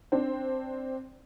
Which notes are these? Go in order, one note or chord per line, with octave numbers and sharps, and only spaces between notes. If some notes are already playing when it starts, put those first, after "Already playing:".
C4 D4